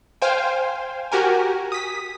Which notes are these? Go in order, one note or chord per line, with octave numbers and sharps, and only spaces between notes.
C5 F5 G5 G#5
F#4 G4 A#4 G#5
D#6 B6